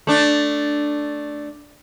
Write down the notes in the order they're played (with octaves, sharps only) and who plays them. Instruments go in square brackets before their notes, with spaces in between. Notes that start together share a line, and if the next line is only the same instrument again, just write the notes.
[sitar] A3 D4